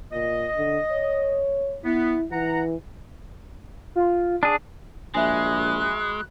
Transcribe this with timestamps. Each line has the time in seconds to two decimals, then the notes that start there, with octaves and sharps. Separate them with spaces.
0.12 A#2 D#5
0.56 D3
0.91 C#5
1.84 B3 E4
2.31 E3 F#5 A#5
3.95 F4
4.43 D4 G#4
5.14 A#1 G#3 F#4 E5 G#5 B5 F#6